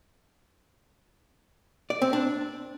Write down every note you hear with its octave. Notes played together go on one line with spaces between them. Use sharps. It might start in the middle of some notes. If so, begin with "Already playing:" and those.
D5
C4
D4